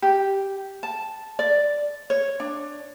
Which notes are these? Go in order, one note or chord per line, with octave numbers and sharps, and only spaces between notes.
G4
A5
D5
C#5
D4